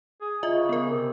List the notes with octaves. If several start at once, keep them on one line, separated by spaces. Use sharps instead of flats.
G#4
C#3 F4 D#5 E5
B3 A#4
C3